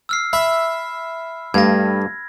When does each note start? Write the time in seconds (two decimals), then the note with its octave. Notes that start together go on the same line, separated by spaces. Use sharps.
0.09 E6 F6 C7
0.33 E5 B5
1.54 G2 G3 A3 F5 G#6 A#6